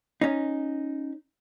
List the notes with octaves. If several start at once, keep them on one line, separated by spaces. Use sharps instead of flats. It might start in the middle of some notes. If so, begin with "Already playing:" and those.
C#4 D#4